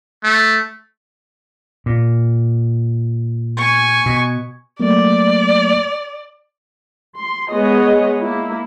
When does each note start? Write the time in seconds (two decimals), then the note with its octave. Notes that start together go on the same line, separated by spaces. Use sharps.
0.23 A3
1.86 A#2
3.57 G#5 C#6
4.06 B2
4.80 F#3 A3 A#3 D5
7.15 C6
7.50 G#3 B3 G#4 C#5 D#5
8.22 A#3 E4